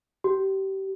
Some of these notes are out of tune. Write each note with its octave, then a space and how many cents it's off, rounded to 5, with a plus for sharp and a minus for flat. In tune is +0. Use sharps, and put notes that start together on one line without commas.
G4 -25